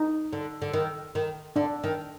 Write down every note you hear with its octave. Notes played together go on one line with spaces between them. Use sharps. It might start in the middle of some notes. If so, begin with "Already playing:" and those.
Already playing: D#4
D3
D3
D#3
D#3
D3 D4
D#3